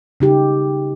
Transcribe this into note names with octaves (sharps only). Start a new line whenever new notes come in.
C#3 D#4 G4